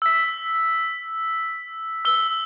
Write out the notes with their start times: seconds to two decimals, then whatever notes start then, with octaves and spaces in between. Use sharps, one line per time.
0.02 E6 B6
2.05 E6 G7